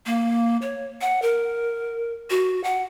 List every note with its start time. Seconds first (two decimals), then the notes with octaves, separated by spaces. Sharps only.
0.06 A#3
0.62 C#5
1.01 F#5
1.22 A#4
2.30 F#4
2.64 F#5